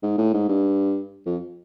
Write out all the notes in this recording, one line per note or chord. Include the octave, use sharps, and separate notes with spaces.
G#2
A2
G#2
G2
F2